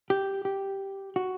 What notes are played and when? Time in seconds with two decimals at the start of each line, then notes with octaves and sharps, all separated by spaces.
0.10 G4
0.45 G4
1.16 F#4